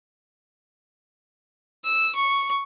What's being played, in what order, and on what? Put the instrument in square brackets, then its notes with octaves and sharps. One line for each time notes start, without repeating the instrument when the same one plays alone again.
[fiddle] E6
C#6